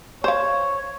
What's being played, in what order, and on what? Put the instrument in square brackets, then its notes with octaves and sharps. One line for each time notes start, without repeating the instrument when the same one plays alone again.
[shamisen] C5 F5 [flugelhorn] C#5